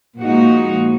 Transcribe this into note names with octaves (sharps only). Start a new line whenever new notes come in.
A#2 F3 G#3 D#4 F#4